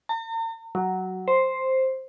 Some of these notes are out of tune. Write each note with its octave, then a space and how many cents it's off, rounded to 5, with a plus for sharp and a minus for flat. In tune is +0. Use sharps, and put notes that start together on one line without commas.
A#5 -45
F#3 +10
C5 +5